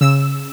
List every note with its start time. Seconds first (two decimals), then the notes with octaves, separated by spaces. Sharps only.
0.01 C#3 E6